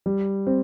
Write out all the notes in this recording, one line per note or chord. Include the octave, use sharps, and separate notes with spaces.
G3
C4